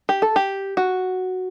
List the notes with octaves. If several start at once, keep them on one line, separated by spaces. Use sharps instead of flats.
G4
A4
G4
F#4